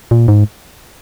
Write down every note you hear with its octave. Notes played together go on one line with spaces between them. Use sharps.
A#2
G#2